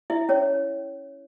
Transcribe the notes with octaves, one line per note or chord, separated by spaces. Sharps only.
E4 E5
C#4 C#5